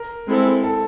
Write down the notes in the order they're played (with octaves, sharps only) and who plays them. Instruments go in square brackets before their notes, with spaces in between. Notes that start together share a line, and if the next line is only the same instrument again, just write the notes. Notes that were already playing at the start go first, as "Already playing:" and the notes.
Already playing: [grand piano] A#4
[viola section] G#3 C4 E4 A4
[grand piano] A4